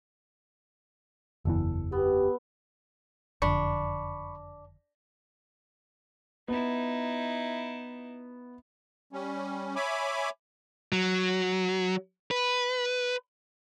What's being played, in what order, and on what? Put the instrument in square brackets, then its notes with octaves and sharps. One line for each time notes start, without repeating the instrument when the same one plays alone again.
[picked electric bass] F#1 E2 E3 [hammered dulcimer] A4
[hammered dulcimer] B3 [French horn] G4
[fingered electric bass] F#1 F2 D3 [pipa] D4 [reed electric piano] B5 C#6
[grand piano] B3 [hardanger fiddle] D#4 E4
[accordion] G3 C#4
C#5 E5 G#5 B5 D6
[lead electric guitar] F#3
B4